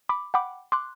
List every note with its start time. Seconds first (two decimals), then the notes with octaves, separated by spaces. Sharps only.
0.09 B5 D6
0.34 F#5 G5 B5 D6
0.72 C6 D6 F#6